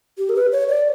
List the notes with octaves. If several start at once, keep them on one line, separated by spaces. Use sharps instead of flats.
G4
A#4
B4
C#5
D5